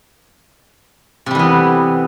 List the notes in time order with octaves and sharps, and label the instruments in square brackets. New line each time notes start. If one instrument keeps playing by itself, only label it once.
[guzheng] C3
G3
E3
B3